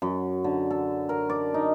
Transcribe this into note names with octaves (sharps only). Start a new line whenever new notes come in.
F#2
D3
A4
A#4
D5
D#4